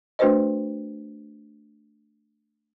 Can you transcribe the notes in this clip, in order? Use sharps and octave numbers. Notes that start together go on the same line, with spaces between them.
A3 D4 F#4 B4 C5 D#5